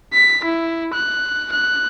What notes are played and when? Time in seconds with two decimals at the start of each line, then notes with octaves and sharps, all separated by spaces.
0.13 B6
0.45 E4
0.94 F#6
1.52 F#6